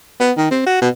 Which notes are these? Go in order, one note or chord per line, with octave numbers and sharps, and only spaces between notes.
B3
D#3
C4
F#4
B2